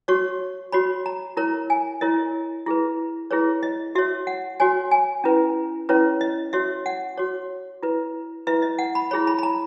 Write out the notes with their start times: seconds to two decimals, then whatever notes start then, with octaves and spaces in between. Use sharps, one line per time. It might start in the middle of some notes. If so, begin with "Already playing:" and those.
0.08 F#4 C#5 C#6
0.72 F#4 C#5 B5
1.06 A#5
1.37 E4 A#4 C#5 A#5
1.70 G#5
2.01 E4 A#4 C#5 D#5
2.66 E4 G#4 B4
3.31 E4 G#4 B4 C#5
3.63 D#5
3.95 F#4 C#5 E5
4.27 F#5
4.60 F#4 C#5 G#5
4.91 G#5
5.24 C#4 E4 B4
5.89 C#4 E4 B4 C#5
6.21 D#5
6.53 F#4 C#5 E5
6.86 F#5
7.17 F#4 C#5
7.83 E4 B4
8.47 E4 B4 E5
8.62 D#5
8.79 F#5
8.95 B5
9.11 E4 G#4 C#5 B5
9.27 B5
9.38 B5
9.43 A#5